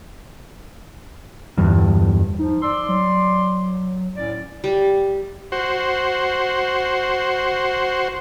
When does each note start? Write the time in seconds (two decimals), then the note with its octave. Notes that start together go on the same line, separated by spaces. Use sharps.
1.57 E2 G2
2.39 F3 D#4
2.62 D5 C6 E6
2.89 F#3
4.16 A2 C#4 D5
4.64 G3
5.52 F#4 C5